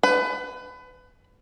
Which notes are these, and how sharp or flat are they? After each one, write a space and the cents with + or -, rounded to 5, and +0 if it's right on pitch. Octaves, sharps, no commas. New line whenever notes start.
B4 +25